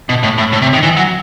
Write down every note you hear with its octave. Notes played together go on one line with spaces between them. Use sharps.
B2
A2
A2
A2
C3
D#3
E3
F#3